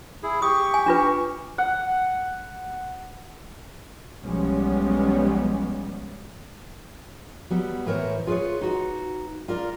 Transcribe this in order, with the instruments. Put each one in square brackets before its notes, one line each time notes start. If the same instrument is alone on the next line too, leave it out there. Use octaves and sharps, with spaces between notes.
[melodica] E4 G#4
[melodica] G4 C#6 [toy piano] D#6
[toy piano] G#5
D4 F4 B4
[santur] F#5
[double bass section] B1 F3 G3 G#3 B3 C#4
[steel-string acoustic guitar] F#3 G3 B3
A2 E3 A#4 C5 C#5
F4 G#4 A#4 B4 C#5
D#4 F#4
F4 A#4 D5